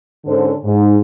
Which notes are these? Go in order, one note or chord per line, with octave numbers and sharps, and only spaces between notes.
G#2 D3 C#4 A4 C5
G#2